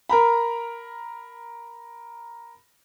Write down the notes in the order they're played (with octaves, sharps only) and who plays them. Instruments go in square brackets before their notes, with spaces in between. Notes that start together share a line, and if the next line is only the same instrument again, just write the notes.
[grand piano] A#4 A#5 B5